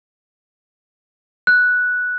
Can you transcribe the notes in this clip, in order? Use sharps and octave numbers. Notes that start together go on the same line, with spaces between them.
F#6